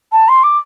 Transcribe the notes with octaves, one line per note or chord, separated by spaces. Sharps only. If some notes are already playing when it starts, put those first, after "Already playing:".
A5
C6
D6